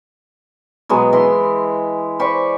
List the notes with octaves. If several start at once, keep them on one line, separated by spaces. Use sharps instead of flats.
B2 F#3 G#3 B3
E3 E4 D#5 C6
C5 D5 B5 C#6